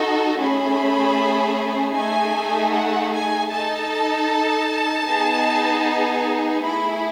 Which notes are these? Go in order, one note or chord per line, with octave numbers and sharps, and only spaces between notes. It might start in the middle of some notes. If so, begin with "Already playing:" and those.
Already playing: D#4 F#4 A4
A3 C#4 G#4 B5
A3 D#4 G#4 G#5
F#5
G#5
D#4 A4 A5
B3 D#4 G#4
A3 E4 G#4 B5